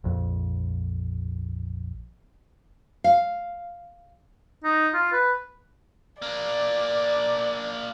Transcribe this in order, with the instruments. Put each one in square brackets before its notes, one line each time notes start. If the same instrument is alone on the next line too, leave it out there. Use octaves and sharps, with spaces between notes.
[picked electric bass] A#1 F2
[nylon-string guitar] F5
[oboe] D#4
F4
B4
[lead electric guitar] A#3 D4 [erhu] D5